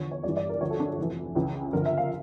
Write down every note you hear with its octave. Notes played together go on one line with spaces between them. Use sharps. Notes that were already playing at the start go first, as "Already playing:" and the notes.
Already playing: E2 D3 F3 C#5
C#5
G1 G2 E3 D5
D5
A#4
D2 D3 F3 C#5
A4
D4
A4
F1 F2 E3
C#2 C#3 E3
G1 F2 D3 F3 A#4
E5
F5